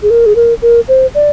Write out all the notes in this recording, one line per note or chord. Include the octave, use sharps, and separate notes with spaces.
G#4
A#4
G#4
A#4
A#4
C5
D5